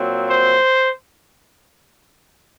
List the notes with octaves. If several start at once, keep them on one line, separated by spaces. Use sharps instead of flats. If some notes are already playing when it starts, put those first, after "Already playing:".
Already playing: A#2 F#3 C4
C5